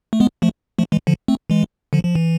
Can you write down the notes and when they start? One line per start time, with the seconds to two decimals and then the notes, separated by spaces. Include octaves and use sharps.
0.13 A3
0.20 G#3 B3
0.42 F3 A3
0.78 F3 A3
0.92 E3 G#3
1.07 D3 F3
1.28 A3 C4
1.50 E3 G#3
1.93 D3 F3
2.04 F3
2.15 E3